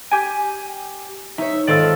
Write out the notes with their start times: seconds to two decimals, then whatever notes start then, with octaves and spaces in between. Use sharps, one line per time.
0.11 G4 G#5
1.38 D#4 C#5 E5
1.67 G#1 F4 A4 D5 D#5 E6